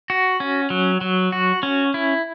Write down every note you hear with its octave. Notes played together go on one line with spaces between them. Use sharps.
F#4
C#4
F#3
F#3
F#4
C#4
E4